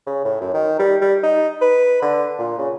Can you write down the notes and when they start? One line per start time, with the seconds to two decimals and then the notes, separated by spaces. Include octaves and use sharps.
0.07 C#3
0.25 A2
0.41 F#2
0.54 D#3
0.79 G3
1.01 G3
1.23 D#4
1.62 B4
2.02 D3
2.39 A#2
2.58 C#3